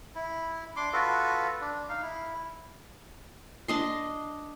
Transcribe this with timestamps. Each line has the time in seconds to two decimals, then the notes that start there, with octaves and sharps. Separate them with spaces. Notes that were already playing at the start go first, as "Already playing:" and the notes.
0.15 E4
0.76 D4 C6 D6
0.93 F4 F#4 A4 B4
1.61 D4
1.89 D#4 F5
2.02 E4
3.68 D4 D#5 C6